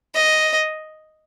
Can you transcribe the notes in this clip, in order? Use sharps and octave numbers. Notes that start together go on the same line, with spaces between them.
D#5